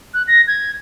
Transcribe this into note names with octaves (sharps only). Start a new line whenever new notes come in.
F#6
A#6
G#6